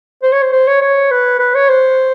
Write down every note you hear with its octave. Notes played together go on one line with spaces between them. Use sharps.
C5
C#5
C5
C5
C#5
C#5
B4
B4
C#5
C5